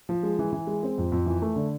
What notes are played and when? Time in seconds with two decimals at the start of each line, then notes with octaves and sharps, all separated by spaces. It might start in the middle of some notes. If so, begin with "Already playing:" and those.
0.09 F3
0.23 G#3
0.39 E3
0.53 E3
0.67 G#3
0.83 C4
0.98 F2
1.12 F2
1.26 E3
1.42 A3
1.56 D3